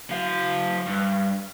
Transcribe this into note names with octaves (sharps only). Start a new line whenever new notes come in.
F#3 F5
G2